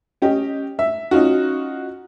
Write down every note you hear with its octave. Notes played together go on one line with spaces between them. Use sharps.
C#4 G4 D#5
E5
C#4 D#4 F4 F#4